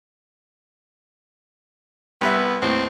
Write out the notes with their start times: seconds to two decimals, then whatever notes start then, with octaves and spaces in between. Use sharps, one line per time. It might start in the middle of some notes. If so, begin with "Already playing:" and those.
2.21 C2 B3 B4 E5
2.62 D#2 A2 C4